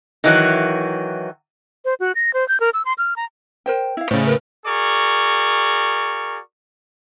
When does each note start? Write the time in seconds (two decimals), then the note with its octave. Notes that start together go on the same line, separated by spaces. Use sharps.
0.24 D#3 E3 F#3
1.85 C5
2.00 F#4
2.15 A#6
2.34 C5
2.49 G6
2.60 A#4
2.74 E6
2.85 C6
2.98 F6
3.16 A#5
3.66 A#4 C5 G5
3.97 E4 F5
4.11 A2 C#3 C5 D5
4.27 A#4 B4
4.66 F#4 G#4 A#4 D5 C#6